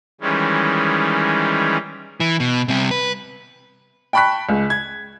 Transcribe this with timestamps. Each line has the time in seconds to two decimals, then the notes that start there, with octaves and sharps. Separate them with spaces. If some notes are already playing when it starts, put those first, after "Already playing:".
0.21 D#3 E3 G3 G#3 C#4
2.20 E3
2.40 B2
2.68 C2 C3
2.91 B4
4.13 G5 A5 B5 C#6 F#6 B6
4.49 C#2
4.70 G#6